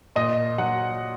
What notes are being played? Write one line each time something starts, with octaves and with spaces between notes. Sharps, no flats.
A#2 D#5
F#3 F#5